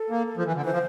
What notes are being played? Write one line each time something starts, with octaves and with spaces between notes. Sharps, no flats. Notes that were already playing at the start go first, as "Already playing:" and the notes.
Already playing: A4
A#3
F3
E3
D3
E3 C5
F3